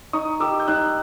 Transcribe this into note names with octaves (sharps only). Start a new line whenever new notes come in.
D#4 C#6 D#6
G4 A#4 D6 E6
G6
D#4 E6 F#6